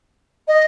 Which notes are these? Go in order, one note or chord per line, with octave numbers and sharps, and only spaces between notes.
D#5